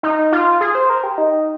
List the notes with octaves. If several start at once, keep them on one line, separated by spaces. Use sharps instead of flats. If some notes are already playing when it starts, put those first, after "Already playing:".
D#4
F4
G#4
C5
A#4
G4
D#4